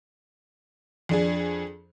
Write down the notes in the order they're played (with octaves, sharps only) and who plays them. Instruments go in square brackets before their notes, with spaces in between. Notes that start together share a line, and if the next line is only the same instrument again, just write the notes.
[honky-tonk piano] F2 D4 G#4